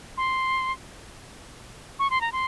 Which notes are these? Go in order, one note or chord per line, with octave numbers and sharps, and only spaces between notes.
C6
C#6
C6
A#5
C6